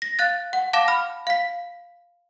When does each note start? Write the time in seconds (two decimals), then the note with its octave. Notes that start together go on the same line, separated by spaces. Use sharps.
0.02 A#6
0.19 F5 F#6 A6
0.53 F#5
0.73 F5 A5 D6 A#6 E7
0.88 B5 F6
1.27 F5 B6